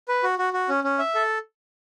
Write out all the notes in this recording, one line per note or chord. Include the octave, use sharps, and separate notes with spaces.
B4
F#4
F#4
F#4
C#4
C#4
E5
A4